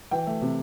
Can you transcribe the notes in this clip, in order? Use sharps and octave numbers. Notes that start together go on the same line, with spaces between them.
E3 G5
A3
C3